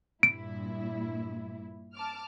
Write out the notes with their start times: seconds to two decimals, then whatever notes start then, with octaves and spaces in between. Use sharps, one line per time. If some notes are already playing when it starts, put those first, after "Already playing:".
0.23 G2 A#2 E4 D7
1.95 A5 D6 F6